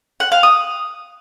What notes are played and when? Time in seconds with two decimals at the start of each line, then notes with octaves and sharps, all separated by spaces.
0.20 F#5
0.32 F5
0.43 D#6